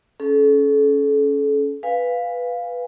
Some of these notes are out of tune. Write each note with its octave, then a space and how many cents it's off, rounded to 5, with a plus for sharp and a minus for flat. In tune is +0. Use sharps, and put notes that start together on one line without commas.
C#4 +10 A4 -35
B4 +0 F5 +0 G#5 -25